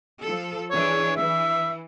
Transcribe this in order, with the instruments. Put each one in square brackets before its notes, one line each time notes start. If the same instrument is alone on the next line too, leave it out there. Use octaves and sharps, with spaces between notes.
[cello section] F3 A4
[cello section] E3 D4 G#4 [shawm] C#5
[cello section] E3 [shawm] E5